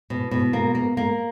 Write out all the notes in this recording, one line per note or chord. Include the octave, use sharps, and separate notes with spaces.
B2
B2
A#3
A#3
A#3